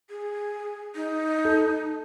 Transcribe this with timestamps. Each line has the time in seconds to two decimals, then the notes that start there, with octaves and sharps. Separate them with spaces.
0.10 G#4
0.95 D#4
1.45 A4